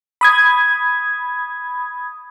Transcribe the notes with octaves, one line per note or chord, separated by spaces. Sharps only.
B5 D#6 G#6